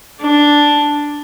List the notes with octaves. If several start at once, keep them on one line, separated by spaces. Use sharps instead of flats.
D4